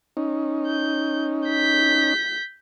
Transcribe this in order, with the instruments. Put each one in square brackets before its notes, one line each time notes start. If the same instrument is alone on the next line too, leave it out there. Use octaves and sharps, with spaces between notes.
[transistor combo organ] C#4 D#4
[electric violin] G6
G6 B6